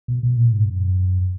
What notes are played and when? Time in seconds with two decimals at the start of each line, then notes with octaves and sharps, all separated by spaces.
0.08 B2
0.23 B2
0.37 A#2
0.52 G#2
0.66 F#2